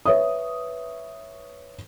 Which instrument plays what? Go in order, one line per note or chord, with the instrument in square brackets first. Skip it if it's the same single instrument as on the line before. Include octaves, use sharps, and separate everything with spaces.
[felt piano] B4 C#5 E5 D#6